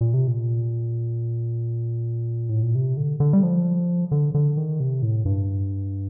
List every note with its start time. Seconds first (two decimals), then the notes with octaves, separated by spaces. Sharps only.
0.01 A#2
0.14 C3
0.27 A#2
2.49 A2
2.62 A#2
2.75 C3
2.97 D3
3.20 D3
3.33 G3
3.43 F3
4.11 D3
4.34 D3
4.57 D#3
4.80 C3
5.02 A2
5.25 G2